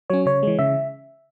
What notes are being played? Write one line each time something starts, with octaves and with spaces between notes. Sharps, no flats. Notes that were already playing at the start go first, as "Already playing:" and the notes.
F#3 C#4 C#5
C#3 C#5
E3 G#3
C#3 E5